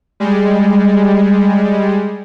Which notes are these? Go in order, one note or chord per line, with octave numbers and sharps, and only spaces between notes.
G3 G#3